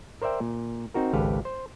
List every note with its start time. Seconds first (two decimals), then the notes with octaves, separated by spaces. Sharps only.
0.22 A#4 C5 D5 E5 G5
0.40 A#2
0.94 C4 D#4 F#4 A#4
1.13 G#1 C#2 G4 A4 B4 F5
1.45 C5